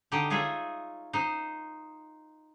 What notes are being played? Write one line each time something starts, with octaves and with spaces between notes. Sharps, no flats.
D3 D#4 G4 D#5 G5
D#4 F4 G#4 C#5 D#5 E5
D#4 C5